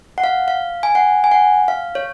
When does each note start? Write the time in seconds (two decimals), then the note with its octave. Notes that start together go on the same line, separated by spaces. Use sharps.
0.18 F#5
0.24 F5
0.48 F5
0.83 G#5
0.95 F#5
1.24 G#5
1.31 F#5
1.68 F5
1.95 C#5